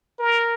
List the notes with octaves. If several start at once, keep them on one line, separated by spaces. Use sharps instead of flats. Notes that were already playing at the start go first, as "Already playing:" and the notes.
A#4